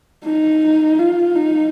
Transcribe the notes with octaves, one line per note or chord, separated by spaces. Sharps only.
D#4
F4
D#4